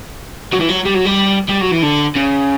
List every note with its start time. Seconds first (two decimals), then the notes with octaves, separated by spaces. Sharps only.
0.52 F#3
0.60 E3
0.69 F#3
0.85 G3
0.94 F#3
1.05 G3
1.49 G3
1.61 F#3
1.71 E3
1.83 D3
2.16 C#3